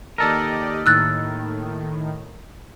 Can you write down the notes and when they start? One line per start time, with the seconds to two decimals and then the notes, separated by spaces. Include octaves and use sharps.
0.18 D#2 G4 A4 A#4 D5 D#5
0.86 A2 D#3 E6 F#6 A6